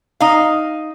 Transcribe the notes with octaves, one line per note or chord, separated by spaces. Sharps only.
D#4 F5